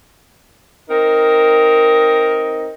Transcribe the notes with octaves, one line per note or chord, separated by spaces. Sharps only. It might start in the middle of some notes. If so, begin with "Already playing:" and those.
C4 D#4 A#4